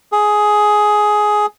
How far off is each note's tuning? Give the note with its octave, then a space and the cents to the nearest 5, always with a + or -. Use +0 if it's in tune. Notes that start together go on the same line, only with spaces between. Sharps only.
G#4 +10